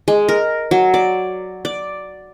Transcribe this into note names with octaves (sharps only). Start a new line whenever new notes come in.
G#3
A#4
F#3
D5
D5